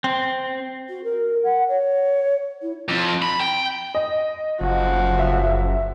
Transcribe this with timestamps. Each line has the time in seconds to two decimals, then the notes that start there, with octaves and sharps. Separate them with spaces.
0.04 C4
0.89 F#4
1.04 A#4
1.43 F#5
1.68 C#5
2.62 E4
2.89 F2
3.22 B5
3.41 G5
3.95 D#5
4.61 F#1 F3 F#4
5.19 E5